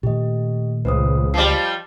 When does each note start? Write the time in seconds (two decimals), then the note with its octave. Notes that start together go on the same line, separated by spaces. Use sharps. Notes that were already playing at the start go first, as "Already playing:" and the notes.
0.03 A#2 D#3 A3 G4 D#5
0.85 C#2 B4 C5 D#6
1.34 F3 G3 D6 C7